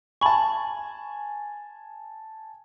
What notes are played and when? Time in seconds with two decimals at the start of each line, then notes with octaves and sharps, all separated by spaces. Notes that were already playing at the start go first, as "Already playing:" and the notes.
0.21 G#5 A5 B5 C#6